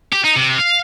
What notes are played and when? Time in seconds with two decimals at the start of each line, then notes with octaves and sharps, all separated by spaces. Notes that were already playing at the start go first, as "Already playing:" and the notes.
0.13 G4
0.24 D#4
0.36 C3
0.58 F5